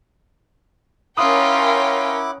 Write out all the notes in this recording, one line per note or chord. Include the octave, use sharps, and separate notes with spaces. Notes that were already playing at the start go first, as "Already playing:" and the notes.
C#4 E4 F4 A#4 F#5 G5 D6 D#6